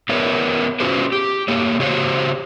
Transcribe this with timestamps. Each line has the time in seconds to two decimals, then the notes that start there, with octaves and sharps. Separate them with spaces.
0.09 B3 A#4 B4 C#5 E5
0.80 C#4 F4 F#4 G#4 B4 C5
1.12 G4
1.48 A3 A#3 C#5
1.80 C#3 F#4 G4 C5 C#5